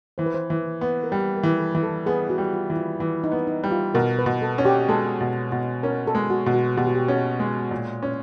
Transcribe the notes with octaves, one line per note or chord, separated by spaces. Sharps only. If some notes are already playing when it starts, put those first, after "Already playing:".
E3 C5
B4
C5
E3
B3
A#4
G3 B4
A#4
E3
A4
E3
A4
B3 G#4
F#4
G3
F4
E3
F4
E3 E4
D#4
B3
D#4
G3
F4
B2 A#4
B4
B2
A4
C#4
G4
G#3 A4
B2
B2
C#4 A#4
A4
G#3
F#4
B2
F#4
B2 G4
F#4
G4
C#4 G#4
G#3
A#2
C#4